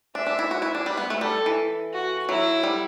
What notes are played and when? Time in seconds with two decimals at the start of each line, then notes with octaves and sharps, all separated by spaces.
0.15 D4 E5
0.26 D4
0.39 E4
0.51 F#4
0.62 E4
0.75 D4
0.86 G3 B4
0.98 B3
1.10 A3
1.21 G3 A4
1.46 E3
1.92 F#4
2.29 F#3 E4
2.63 G3